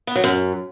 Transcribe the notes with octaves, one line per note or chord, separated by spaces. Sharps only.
B3
F#3
F#2